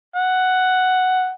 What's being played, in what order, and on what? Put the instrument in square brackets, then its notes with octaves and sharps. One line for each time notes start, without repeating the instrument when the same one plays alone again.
[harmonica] F#5